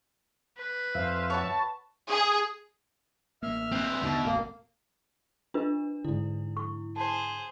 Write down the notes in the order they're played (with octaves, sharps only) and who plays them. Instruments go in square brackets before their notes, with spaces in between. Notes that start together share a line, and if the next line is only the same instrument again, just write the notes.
[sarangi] B4
[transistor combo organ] F2 E5 [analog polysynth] C5 F5
[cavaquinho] F#4 B4 C#5 [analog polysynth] A5
[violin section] G#4
[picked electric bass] A1 A#3 [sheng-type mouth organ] E5 F6
[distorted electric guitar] C4 B4
[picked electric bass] D#2 D3 D#3 [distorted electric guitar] B2
[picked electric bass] E1 A1 A3 [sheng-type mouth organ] A#3
[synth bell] D4 [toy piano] F4 B4 D#5
[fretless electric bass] G#2 D3 [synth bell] E4
[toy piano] C#6
[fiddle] G#4 C5 [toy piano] A5